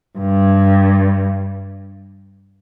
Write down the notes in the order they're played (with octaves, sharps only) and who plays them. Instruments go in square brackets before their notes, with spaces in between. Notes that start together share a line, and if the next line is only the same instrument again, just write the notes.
[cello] G2